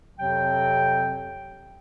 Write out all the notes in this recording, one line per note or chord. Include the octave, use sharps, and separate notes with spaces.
F2 C3 F#3 C4 G5